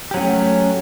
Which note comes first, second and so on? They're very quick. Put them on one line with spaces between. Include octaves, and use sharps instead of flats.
G4 F#3 C#4 A3